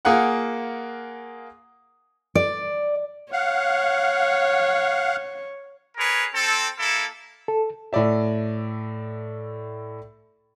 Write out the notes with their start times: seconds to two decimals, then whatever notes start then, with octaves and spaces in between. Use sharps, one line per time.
0.05 A#3 F4 G#4 A#4 F#5 D#6
2.35 D5
3.32 C#5 F5 F#5
5.97 G#4 A#4 B4 C#5
6.33 C4 A4
6.79 A#3 E4 A4
7.48 A4
7.93 A2 A4 D5 E5